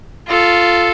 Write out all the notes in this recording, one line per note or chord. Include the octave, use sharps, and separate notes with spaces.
F4 A4